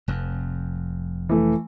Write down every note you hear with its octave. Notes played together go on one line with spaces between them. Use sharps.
F1 F2
E3 A3